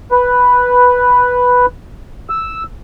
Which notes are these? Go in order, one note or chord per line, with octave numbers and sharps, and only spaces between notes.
B4
E6